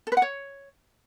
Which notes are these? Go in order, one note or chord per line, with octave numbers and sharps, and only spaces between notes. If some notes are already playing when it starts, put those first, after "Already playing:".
A4
B4
F#5
C#5